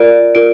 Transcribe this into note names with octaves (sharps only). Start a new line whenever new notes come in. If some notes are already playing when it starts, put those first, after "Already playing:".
Already playing: F4 A#4 D5 D7
F4 A#4 D7